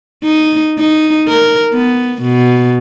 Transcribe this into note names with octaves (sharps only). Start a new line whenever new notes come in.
D#4
D#4
A#4
B3
B2